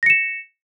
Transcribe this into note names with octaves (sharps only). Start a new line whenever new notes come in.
A#6 C#7 E7